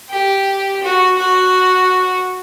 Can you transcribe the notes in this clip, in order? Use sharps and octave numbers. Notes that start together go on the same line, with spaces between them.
G4
F#4
F#4